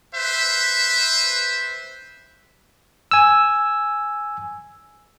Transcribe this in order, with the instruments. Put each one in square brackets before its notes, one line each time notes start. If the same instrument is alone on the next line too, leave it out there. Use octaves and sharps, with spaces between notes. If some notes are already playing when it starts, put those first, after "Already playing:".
[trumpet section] B4 C5 E5
[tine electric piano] G#5 E6